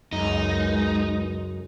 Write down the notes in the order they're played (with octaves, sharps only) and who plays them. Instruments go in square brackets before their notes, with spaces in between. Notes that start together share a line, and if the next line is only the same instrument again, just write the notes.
[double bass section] C#2 G#3 [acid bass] F#2 [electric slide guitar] D#4